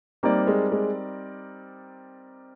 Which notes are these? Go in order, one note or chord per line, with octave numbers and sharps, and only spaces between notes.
G3 A#3 C4 D#4 A#4 D5
G#3
G#3